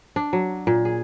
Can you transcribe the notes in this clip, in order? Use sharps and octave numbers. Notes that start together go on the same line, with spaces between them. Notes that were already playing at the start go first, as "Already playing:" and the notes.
D4
F#3
A#2
G#4